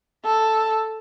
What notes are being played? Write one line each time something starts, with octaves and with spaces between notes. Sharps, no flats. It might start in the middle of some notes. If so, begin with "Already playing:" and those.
A4